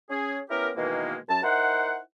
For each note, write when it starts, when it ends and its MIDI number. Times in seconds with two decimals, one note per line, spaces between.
0.10 0.38 61
0.10 0.38 68
0.51 0.70 59
0.51 0.70 61
0.51 0.70 64
0.51 0.70 67
0.51 0.70 70
0.77 1.15 47
0.77 1.15 51
0.77 1.15 52
0.77 1.15 56
0.77 1.15 58
1.29 1.42 42
1.29 1.42 81
1.44 1.98 63
1.44 1.98 64
1.44 1.98 70
1.44 1.98 72
1.44 1.98 78